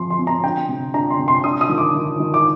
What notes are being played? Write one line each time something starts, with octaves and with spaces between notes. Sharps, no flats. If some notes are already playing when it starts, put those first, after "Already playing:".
Already playing: F3 C4 C6
C6
C4
A#5
D4 G5
C3
D4 A#5
C6
C3
C6
D4 D#6
D#6
D#3
D6
D#3
D#3
D6